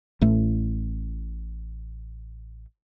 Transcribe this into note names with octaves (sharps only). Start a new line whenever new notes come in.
A1 A2 A3